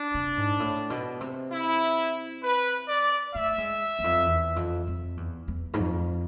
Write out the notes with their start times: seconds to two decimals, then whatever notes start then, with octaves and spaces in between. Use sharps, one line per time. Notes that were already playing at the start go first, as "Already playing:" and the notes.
Already playing: D4
0.14 C3
0.37 G#2
0.60 A2
0.90 B2
1.21 C3
1.52 E4
2.43 B4
2.89 D5
3.35 A3 E5
3.58 G#3
3.99 E2
4.04 F2
4.26 E2
4.56 F2
4.87 F2
5.17 E2
5.48 E2
5.73 G#2
5.79 F2